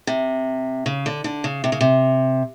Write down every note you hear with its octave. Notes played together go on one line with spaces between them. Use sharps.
C3
C#3
D3
D3
C#3
C3
C#3
C3